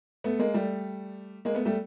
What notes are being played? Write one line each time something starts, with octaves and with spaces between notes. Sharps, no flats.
A3 B3
G#3 A#3
G3 A3
G#3 A#3
A3 B3
G3 A3